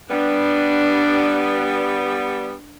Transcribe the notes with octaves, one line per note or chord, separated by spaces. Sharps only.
G3 B3 D4